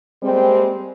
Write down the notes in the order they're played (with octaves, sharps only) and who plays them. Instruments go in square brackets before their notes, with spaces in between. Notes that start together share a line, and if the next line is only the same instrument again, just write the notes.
[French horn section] G3 G#3 A#3 C4